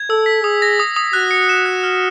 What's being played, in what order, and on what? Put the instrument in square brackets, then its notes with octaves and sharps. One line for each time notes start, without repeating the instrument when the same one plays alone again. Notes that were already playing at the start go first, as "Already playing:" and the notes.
Already playing: [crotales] G#6
[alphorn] A4 [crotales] E6
[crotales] B6
[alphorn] G#4 [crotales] D#6
[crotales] A#6
D#6
D#6
[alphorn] F#4 [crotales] F#6
[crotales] C#7
E7
F#6
F6